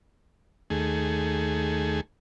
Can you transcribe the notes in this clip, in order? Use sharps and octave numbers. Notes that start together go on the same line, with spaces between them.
D#2 A3 G#4